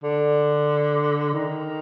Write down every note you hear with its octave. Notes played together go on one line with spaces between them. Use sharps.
D3
D#3